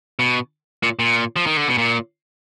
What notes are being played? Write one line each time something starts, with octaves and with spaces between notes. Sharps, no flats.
B2
A#2
A#2
F3
D#3
D3
B2
A#2